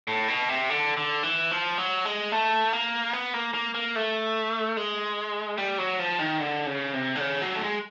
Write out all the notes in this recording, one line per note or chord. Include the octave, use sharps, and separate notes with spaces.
A2
B2
C3
D3
D3
E3
F3
F#3
G#3
A3
A#3
B3
A#3
A#3
A#3
A3
G#3
G3
F#3
F3
D#3
D3
C#3
C3
D3
C#3
F#3
A3
G#3